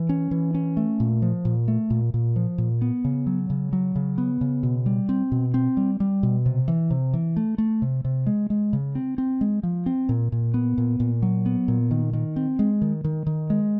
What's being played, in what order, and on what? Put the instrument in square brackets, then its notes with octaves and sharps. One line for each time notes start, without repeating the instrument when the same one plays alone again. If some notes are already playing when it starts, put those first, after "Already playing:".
Already playing: [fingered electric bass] E3
C#4
E3
C#4
A3
A#2
F3
A#2
A3
A#2
A#2
F3
A#2
B3
C#3
F#3
C#3
F#3
C#3
B3
C#3
B2
G3
C4
B2
C4
G3
G3
B2
C3
E3
C3
E3
A3
A3
C3
C3
G#3
G#3
C#3
C4
C4
G#3
F3
C4
A#2
A#2
B3
A#2
A#2
F#3
B3
A#2
D#3
D#3
C4
G#3
D#3
D#3
D#3
G#3